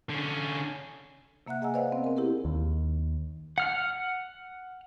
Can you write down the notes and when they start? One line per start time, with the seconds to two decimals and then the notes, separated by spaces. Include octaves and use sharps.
0.10 D3 C#4
1.47 C3 A#3 E5 F#5 F#6
1.62 G#4 D#5 F#5 G#5 A#5 E6
1.74 B4 C5 D5 D#5 F5 F#5
1.92 B3 C4
2.04 C4 A#4
2.16 E4 G4 G#4 A#4
2.45 D#2
3.58 F#5 F6